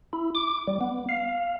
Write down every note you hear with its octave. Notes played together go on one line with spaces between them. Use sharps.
E4
D6
G3
B3
F5